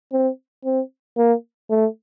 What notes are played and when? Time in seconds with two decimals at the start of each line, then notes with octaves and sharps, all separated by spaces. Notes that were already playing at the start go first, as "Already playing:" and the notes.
0.13 C4
0.65 C4
1.17 A#3
1.70 A3